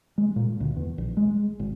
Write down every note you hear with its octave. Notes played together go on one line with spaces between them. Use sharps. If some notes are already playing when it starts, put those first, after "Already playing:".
G#3
A#2
D2
E2
A#1
G#3
G#1